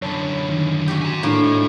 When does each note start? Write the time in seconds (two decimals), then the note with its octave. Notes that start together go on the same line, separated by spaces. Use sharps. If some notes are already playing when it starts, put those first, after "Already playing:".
0.02 F#2 D3 C#5 A5 B5
0.49 D#3
0.88 F#4 G4
1.02 G#5 A#5
1.23 A2 A#3 D4 F5
1.44 G#2 D#4